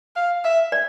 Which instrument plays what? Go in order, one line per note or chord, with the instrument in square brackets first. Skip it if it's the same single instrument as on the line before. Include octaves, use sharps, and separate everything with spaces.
[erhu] F5
E5
[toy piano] D5